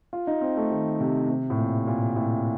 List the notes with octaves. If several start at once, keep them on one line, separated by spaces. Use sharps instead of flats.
F4
D#4
C4
A3
D#3
C3
C3
A2
A#2
A#2
A2